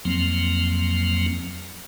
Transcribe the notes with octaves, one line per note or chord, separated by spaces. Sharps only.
F2 F3 F#3 A#3 C4